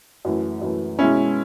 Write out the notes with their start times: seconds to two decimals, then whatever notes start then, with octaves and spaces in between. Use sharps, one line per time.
0.25 F#2 E3 A3
0.61 F#2 E3 A3
0.99 B2 G#3 C#4 E4